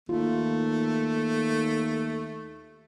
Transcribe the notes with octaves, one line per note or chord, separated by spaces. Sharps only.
D#2 A3 F4